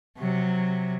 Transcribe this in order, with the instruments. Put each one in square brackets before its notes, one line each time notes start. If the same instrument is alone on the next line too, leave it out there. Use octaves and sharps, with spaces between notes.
[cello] C3 F#3